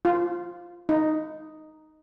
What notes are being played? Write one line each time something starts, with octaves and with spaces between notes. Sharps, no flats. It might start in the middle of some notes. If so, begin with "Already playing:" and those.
F4
D#4